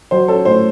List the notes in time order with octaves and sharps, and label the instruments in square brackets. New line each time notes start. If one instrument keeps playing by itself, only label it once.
[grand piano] F#3 C5
C#4 A4
A2 C5